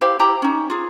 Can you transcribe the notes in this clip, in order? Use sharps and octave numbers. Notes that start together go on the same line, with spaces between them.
E4 G4 C5 F5
E4 G4 A#5
C#4 D#4
F4 G#4